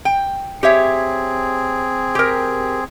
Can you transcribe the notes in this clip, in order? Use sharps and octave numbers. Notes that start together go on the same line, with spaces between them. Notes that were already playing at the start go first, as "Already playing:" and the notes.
G5
C4 G4 G#4 C#5 E5
G4 A#4